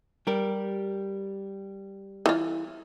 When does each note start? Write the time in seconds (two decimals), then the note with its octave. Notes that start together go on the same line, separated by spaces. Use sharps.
0.27 G3 G4 A#4
2.26 E3 F4